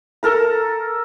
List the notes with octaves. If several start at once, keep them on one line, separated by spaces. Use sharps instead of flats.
A4 A#4 A#5